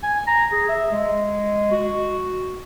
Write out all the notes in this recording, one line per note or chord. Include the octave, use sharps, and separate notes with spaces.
G#5
A#5
G#4
E5
G#3
F#4